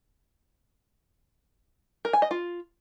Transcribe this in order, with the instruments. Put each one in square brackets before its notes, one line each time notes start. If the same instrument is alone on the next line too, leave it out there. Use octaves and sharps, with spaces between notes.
[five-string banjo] A#4
G#5
D#5
F4